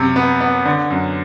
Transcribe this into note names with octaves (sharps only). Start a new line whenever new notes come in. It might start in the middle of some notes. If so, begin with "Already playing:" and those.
Already playing: F#2 C3
B3
B3
D3
F#2